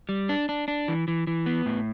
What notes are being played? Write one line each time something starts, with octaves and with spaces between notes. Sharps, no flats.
G3
D4
D4
D4
E3
E3
E3
B3
A2